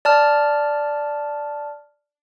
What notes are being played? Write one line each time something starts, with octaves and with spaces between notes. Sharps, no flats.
D5 A5 F6